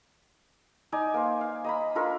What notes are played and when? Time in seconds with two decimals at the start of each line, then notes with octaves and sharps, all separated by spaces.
0.92 D#4 D5 G#5
1.14 A#3 C5
1.41 F5
1.64 D#5 A#5 B5
1.95 D4 F4 A4 A#4